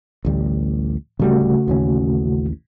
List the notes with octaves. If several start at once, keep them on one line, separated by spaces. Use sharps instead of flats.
A1 D2 G3
D1 C#3 G3 A3 F#4
A1 D#2 C#4